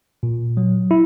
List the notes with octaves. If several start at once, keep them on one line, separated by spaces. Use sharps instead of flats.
A#2
F#3
E4